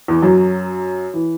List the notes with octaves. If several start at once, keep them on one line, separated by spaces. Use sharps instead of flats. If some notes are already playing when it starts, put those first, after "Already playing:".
E2 E3
F#2 F#3
E3